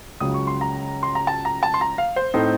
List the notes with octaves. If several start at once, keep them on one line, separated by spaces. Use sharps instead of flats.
C#2 C#3 F#3 D#6
C#6
C6
A#5
C6
A#5
A5
A#5
A5
C6
A#5
F5
C5
A2 A3 C4 D#4